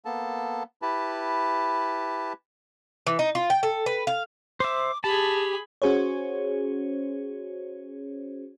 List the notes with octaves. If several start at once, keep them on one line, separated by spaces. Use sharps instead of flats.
A#3 B3 A4 A5
E4 G4 B4 A5
E3
D#4
F4
G5
A4
B4
F5
C5 E5 D6
G4 G#4 A5 B5
C#4 F#4 G#4 C5 C#5